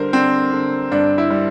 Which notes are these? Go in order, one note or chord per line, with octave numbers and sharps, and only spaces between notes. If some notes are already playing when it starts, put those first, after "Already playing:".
Already playing: D3 G3 A#4 C5
D3 C4
D3
G2 D4
E4
G3